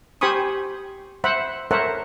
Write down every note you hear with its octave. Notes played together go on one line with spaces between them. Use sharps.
G4 C5 G#5 B5 C#6 D#6
C5 E5 F#5 B5
A4 A#4 C5 C#5 E5 F#5